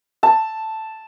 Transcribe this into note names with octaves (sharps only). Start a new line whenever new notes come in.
A5